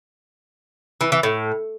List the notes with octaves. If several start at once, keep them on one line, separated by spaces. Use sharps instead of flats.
E3
E3
A2